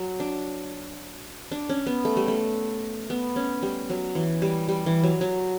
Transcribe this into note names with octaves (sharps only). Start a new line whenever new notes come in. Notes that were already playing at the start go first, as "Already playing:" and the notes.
Already playing: F#3
D4
D4
C#4
B3
A3
G3
A3
B3
C#4
G3
F#3
E3
G3
G3
E3
F#3
F#3